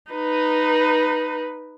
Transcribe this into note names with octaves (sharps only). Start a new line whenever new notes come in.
D#4 B4